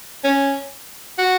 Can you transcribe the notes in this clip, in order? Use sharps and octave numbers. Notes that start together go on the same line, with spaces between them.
C#4
F#4